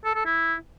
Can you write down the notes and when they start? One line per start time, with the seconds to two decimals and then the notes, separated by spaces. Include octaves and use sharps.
0.05 A4
0.15 A4
0.25 E4